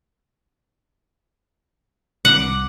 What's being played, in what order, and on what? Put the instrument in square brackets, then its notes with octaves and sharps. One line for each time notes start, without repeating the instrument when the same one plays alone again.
[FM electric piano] C2 D6 [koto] F#5